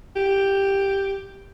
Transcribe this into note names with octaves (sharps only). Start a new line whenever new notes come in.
G4